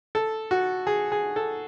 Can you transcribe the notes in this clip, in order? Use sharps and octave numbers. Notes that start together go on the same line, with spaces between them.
A4
F#4
G#4
G#4
A4